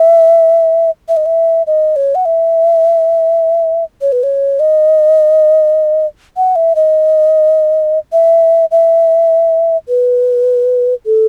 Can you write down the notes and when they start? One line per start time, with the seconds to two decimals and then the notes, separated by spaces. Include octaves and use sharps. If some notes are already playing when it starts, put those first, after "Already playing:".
Already playing: E5
1.09 E5
1.17 D#5
1.26 E5
1.67 D#5
1.96 C#5
2.15 F#5
2.25 E5
4.02 C#5
4.12 B4
4.23 C#5
4.60 D#5
6.37 F#5
6.56 E5
6.76 D#5
8.13 E5
8.71 E5
9.88 B4
11.06 A4